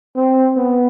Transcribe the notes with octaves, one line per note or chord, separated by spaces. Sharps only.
C4
B3